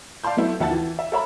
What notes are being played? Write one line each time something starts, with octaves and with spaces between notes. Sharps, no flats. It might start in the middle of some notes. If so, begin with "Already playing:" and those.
D5 F5 A5 C6 G6
F#3 A3 B3 E4
D#2 F3 E5 F#5 A5 A6
E3
E5
A4 A#4 C#5 E5 A#5 B5